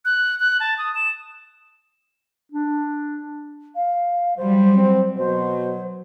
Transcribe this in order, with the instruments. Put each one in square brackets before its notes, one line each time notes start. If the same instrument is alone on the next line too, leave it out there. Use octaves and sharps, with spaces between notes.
[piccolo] F#6
F#6
A5
D#6
E7
[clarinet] D4
[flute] F5
[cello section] F#3 G3 [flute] C5
[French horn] C4
[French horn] B2 [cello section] F#3 [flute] C5